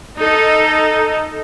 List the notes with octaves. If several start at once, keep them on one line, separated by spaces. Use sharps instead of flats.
D#4 A4